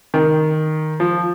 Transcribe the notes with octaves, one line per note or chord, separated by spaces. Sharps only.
D#3
F3